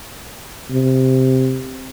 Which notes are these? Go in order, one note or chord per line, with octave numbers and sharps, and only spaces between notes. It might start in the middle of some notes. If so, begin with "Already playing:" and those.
C3